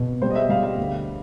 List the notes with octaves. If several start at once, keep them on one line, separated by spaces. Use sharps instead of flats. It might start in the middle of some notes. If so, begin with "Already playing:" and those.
Already playing: B2
G3 C5
D#5
E5
G3 F5
F5
D2